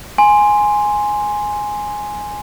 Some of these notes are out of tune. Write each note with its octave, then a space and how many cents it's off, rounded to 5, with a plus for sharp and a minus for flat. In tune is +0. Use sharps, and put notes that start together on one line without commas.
G#5 +0 C6 +0